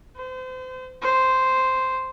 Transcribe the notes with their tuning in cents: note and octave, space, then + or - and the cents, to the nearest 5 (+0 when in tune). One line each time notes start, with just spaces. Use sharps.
C5 -35
C5 -5